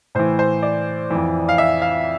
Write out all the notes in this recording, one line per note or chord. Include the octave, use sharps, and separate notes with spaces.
A2 E3 C5
C5
D5
F2 E3
F5
E5
F5